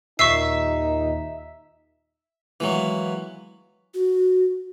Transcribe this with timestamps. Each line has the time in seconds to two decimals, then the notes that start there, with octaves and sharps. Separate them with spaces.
0.19 D#2 A#2 D#4 E5 C#6 E6 C7
2.60 E3 F#3 G#3 A#3 B3
3.94 F#4